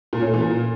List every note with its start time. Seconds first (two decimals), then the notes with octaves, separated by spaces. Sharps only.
0.13 A#2
0.20 C#4
0.27 A3
0.34 E3
0.41 A#2